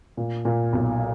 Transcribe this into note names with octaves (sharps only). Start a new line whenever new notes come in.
A#2
A#2
B1